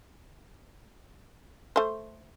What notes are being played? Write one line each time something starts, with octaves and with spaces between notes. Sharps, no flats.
A3 C5